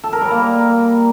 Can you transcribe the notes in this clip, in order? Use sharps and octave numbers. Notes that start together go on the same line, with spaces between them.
A4
A#4
G3
A#3